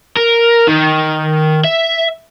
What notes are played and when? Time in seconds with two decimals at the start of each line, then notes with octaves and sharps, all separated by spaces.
0.17 A#4
0.68 D#3
1.64 E5